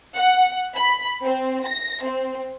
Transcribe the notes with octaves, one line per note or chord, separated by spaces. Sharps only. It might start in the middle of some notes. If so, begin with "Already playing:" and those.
F#5
B5
C4
A#6
C4